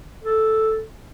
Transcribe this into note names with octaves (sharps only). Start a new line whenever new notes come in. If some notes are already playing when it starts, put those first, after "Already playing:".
A4